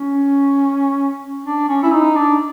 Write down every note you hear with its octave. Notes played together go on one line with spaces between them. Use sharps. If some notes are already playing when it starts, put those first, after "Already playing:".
Already playing: C#4
D4
C#4
E4
D#4
D4